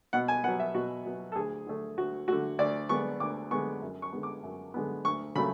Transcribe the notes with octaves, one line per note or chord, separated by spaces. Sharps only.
B2 F#5
G#5
F#3 B3 F#5
E5
B2 F#4
F#3 B3
A4
D2 G#4
D3 A3
D2 F#4
D3 A3 F#4
D2 D5
D3 G#3 B3 C#6
D2 D6
D3 G#3 B3 C#6
F#2
C#6
D3 G#3 B3
D6
F#2
D3 G#3 B3
D2 C#6
C#3 F#3 A3 B5